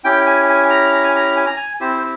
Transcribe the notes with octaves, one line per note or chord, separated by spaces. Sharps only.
C#4 E4 G4 G5
G#5
G#5
A#5
A#5
G#5
A#5
G#5
A#5
G#5
C4 E4 G4 C5
C5